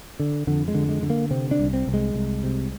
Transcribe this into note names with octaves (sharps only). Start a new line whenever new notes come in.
D3
F2 D3
G#3
D3
G#3
D3
A#3
C3 C4
D4
C2
C4
C2
G#3
C2
C3